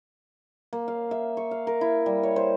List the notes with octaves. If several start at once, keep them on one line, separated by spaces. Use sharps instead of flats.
A#3
F5
E5
C#6
F5
A#4
E4
G3
C#5
C5